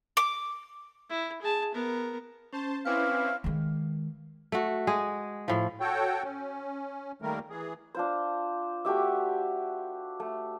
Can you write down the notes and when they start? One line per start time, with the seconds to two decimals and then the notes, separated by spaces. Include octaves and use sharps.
0.17 D6
1.10 E4
1.42 G#4 A5
1.75 B3 A#4
2.53 C#4 C5 A5
2.86 C4 C#4 E4 B4 F5 D6
3.44 D#3 G#3
4.52 A3 F#4
4.87 G#3 G#4
5.48 A2 F3
5.80 F#4 A4 C#5 G5
6.23 C#4
7.22 D#3 G3 A3 A#3 A#4
7.50 E3 G#4
7.95 D4 F4 C5
8.85 A3 F#4 G4 E5
10.20 A3